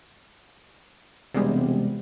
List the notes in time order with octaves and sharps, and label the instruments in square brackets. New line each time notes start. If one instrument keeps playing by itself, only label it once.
[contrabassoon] E1 [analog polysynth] C3 G3 G#3